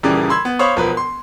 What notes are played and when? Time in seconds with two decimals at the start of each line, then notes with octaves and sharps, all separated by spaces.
0.03 D#1 C#3 E3 G3 A#4 D5
0.30 B5 C6 E6 G#6
0.45 B3
0.59 C5 C#5 F5 B5 C#6 D#6
0.76 E1 F3 A#4 B4
0.97 C6